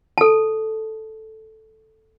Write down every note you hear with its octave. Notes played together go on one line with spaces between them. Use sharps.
A4 A5